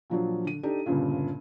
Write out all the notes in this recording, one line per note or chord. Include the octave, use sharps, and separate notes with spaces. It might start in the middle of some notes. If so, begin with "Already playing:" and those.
A#2 F3 F#3 D4
D3 D#7
D4 D#4 G4 A4
G1 C#2 G2 A#2 C#3